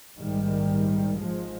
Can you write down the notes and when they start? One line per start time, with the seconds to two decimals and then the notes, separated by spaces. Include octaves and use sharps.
0.20 A#1 G#2 D#3 G3
1.19 G#1 G#2 F3 G#3